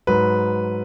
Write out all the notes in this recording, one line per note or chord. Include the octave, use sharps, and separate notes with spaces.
G#2 F#3 B4